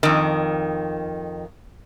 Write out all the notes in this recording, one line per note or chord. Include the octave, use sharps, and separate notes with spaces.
F2 D#3